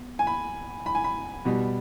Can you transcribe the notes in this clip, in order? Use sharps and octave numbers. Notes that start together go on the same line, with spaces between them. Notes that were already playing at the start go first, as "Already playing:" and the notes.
Already playing: B3
G#5
B5
B5
G#5
B5
B2 G3 B3